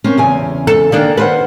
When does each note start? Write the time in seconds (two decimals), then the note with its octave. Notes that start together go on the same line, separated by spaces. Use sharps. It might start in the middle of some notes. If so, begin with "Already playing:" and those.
0.04 A#3 C4 C#4
0.18 E2 C#3 G#5
0.67 A4
0.92 D#3 A#3 D4 D5 G5
1.17 A#3 B4 C5 F#5